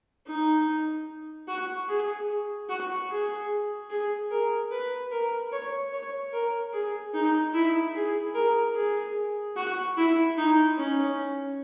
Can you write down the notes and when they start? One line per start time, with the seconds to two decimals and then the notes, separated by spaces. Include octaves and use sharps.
0.26 D#4
1.48 F#4
1.89 G#4
2.69 F#4
3.10 G#4
3.90 G#4
4.31 A#4
4.71 B4
5.11 A#4
5.52 C#5
5.93 C#5
6.33 A#4
6.73 G#4
7.14 D#4
7.54 E4
7.95 G#4
8.34 A#4
8.75 G#4
9.56 F#4
9.97 E4
10.37 D#4
10.78 C#4